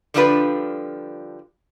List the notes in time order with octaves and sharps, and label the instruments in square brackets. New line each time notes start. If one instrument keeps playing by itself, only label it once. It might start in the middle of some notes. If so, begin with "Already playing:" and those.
[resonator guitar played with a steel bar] D3 F3 G3 D4 F4 B4